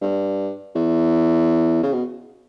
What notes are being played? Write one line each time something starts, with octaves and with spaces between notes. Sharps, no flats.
G2
E2
C#3
B2